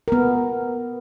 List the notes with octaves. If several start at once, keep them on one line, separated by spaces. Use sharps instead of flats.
B3 A#4